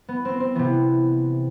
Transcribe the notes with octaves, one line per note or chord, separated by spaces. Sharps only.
B3
C4
C4
C3 E3 B3